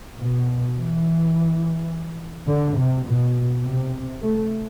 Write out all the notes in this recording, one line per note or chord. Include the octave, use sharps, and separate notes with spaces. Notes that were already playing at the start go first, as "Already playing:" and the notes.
B2
E3
D3
C3
B2
C3
A3